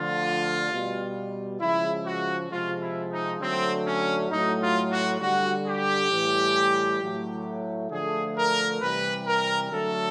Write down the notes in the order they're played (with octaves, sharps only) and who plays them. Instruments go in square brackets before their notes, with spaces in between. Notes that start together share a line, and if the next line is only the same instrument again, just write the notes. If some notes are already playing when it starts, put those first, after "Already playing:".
Already playing: [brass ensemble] D3 F3 A3 F4
B2 G3
C#3 F3 G#3 E4
F#4
C3 F3 G#3 F4
E4
D#4
D3 F#3 A3 C4
C#4
A2 F#3 A3 D#4
F4
F#4
D3 G3 F#4
G4
A2 E3 G3
A2 F#3 A3
D3 F3 A3 G#4
A#4
C3 E3 G3 B4
A#4
D3 F#3 A3 A4